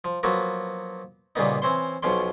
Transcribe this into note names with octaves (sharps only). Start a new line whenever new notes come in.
F3
F3 F#3 A#3 B3 F#4
A#2 C#3 G3 A#3 B3 D#4
E3 C4 C#4 C5 C6
B1 B2 F3 C#4 G5 C6